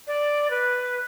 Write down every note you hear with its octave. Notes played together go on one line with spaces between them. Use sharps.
D5
B4